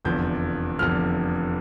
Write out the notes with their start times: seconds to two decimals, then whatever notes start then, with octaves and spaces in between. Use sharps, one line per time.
0.05 F1 E2 D3 F3 G6
0.79 F1 E2 D3 F3 F6